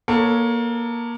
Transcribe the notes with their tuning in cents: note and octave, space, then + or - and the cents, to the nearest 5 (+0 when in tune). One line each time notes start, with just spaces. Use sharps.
A#3 +20 A4 +35 C#5 +0